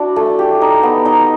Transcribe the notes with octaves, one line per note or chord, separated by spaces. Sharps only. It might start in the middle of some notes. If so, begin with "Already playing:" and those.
Already playing: D4 E4 F#4
A3
G4
D#4
B3
D#4